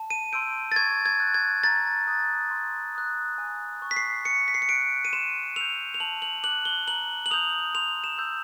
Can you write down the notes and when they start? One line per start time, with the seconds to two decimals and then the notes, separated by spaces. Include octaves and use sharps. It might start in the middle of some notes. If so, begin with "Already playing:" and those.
Already playing: A5
0.10 D#7
0.33 C6 E6 G6 D7
0.72 A6
0.76 C#6 G#6
1.06 G#6
1.20 F#6
1.34 G#6
1.64 A#5 A6
2.07 D#6 F#6
2.51 C6
2.95 D#6 F#6
3.38 G#5
3.82 C#6 F#6
3.91 B6
3.96 C7
4.25 C#6 C#7
4.48 B6
4.54 C7
4.62 C#7
4.69 F#6 D7
5.05 D#7
5.13 C6 E7
5.56 E6 G6 F7
5.94 F7
6.00 A5 F#7
6.22 F#7
6.43 D6 F#6 F#7
6.65 G7
6.87 A#5 F#7
7.26 F#7
7.31 D#6 G6 F7
7.75 C6 F7
8.04 E7
8.18 E6 G6